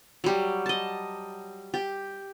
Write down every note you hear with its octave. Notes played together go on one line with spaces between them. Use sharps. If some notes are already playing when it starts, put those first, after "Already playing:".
F#3 G3
D#5 A5
G4